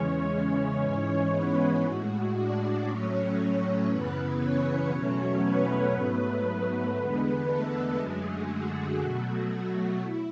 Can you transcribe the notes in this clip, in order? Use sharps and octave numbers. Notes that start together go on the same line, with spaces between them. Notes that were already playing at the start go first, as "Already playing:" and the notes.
Already playing: E2 C#3 E3 G#3 C#4 C#5
C#4 C#5
G#2 E3 G#3
B3 B4
A2 G#3 F#4
D4 D5
A2 F#3 A3 C#4 C#5
F#2 C#3 E3 B3 B4
C#4 C#5
E2 B2 F#3 A3
B3 B4
G#2 F#3 A3 B3 B4
E2 D3 G#3
A3 A4
F#2 D3 F#3 G#3 A3 G#4
F#4
B2 F#3 A3 F#4
F#4
E4